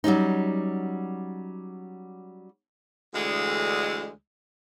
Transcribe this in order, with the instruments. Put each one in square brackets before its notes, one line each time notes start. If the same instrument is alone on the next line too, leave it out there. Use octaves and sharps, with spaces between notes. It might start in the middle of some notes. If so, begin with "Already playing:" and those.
[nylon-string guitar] F#3 G3 C#4 D#4
[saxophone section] D2 D3 E3 G#3